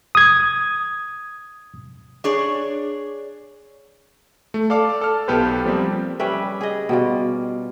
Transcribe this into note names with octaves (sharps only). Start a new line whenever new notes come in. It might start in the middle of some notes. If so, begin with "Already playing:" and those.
D#6 G#6
D4 G#4 C#5
A3
A4 D5 F5 D6
A4 F6
B1 B3 G4 A4 B4 C5
F3 G3 A#3 C4
G3 C#4 B4 E5
G#4 D#5
B2 G3 F4